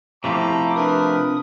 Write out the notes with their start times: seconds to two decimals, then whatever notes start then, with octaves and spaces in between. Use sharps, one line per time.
0.24 C3 F3 A3 E4 G4 A#5 D6
0.76 D4 A#4 B4 D#6